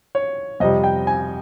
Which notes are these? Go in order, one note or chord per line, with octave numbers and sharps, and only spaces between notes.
C#5
F2 C3 G3 D#5
G5
G#5